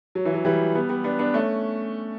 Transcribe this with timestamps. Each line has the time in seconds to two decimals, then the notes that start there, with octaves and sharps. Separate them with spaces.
0.15 F#3
0.25 E3
0.34 F#3
0.45 E3 G3
0.75 G3 B3
0.89 G3 B3
1.04 B3 D4
1.19 B3 D4
1.34 A3 C#4